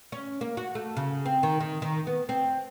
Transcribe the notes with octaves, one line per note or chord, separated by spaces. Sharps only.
C#4
A#3
F#4
A3
C#3
C4
D#3
D#3
D#3
B3
C4